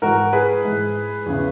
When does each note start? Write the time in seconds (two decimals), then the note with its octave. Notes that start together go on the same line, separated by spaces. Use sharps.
0.02 G#2 E3 F#4 A#4
0.33 G#4 B4
0.65 G#2 E3
1.26 E2 C#3 E3